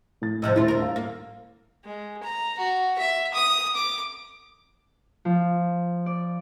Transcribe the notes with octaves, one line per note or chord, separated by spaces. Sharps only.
A2 A6
A2 C3 F3 D#5 E6
D#1 A2 A3 E4 F4
D2 A#4
F5
A#3
G#3
A#5
F#4
E5
D#6
D6
F3
D5